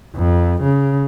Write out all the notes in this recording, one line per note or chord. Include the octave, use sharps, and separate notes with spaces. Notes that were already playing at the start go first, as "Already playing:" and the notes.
F2
C#3